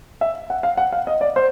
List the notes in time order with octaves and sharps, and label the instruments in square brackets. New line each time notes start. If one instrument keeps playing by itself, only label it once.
[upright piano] E5
F#5
F5
F#5
F5
D#5
D5
C5